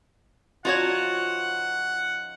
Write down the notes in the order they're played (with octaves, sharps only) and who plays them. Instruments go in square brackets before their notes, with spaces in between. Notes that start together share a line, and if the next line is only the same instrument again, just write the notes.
[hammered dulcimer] C#3 F3 D#4 [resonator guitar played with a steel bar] F4 F#4 C#5 [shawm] F#5